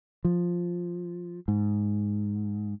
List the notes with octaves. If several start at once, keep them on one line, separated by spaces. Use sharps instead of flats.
F3
G#2